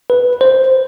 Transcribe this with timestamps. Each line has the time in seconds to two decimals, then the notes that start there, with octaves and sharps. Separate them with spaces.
0.10 B4
0.41 C5